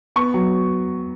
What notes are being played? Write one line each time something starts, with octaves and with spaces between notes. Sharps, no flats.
B3 C#6
F#3